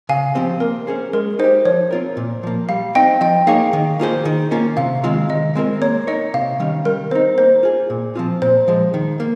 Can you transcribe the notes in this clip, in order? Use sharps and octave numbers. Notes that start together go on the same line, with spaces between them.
C#3 F5 G#5
F3 C4 G4 C5
A#3 A#4
C#4 G#4 C5
G#3 A#4
D#4 G4 C5
F3 C#5
C4 F4 A#4
A#2
F3 A#3
G3 F5
C4 D#4 D#5 G5
F3 D#5 G5
A#3 D#4 G#4 C#5 F5
D#3
A#3 F4 G#4 C5
D#3
A#3 C#4 F4
C3 F5
D#3 G#3 C4 F4
D#3 D#5
G#3 C4 F4 A#4
A#3 C#5
D#4 A#4 C#5 D#5
C3 F5
D#3 G3 C#4
G3 A#4
C4 D#4 C5
A#3 C5
F4 G#4
A#2
F3 C4 F4
A#2 C5
F3 G#3
D#3
A#3